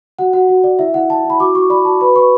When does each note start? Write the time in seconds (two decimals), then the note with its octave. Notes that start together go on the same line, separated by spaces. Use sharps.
0.19 F#4 F#5
0.33 F#4 F#5
0.49 F#4
0.64 D5
0.79 E4 E5
0.94 E4 F#5
1.10 E4 A5
1.25 E4 B5
1.40 F#4 D6
1.55 F#4 C#6
1.70 D5 B5
1.85 F#4 A5
2.01 B4 B5
2.15 B4 C#6